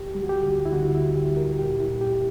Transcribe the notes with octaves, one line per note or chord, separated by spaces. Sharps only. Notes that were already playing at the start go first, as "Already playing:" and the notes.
Already playing: D2 G4
G3
F#4
G4
D2
E4
D3 F#4
E4
D2
G4
G3
A#4
A#2 G4
E4
A#2
G4